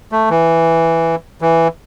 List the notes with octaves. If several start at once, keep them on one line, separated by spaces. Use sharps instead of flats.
A3
E3
E3